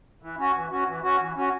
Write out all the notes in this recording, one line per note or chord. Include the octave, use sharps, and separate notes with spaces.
E3
C#4 F#4
E3
C#4 F#4
E3
C#4 F#4
E3
C#4 F#4